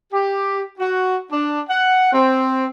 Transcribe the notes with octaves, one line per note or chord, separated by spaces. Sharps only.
G4
F#4
D4
F#5
C4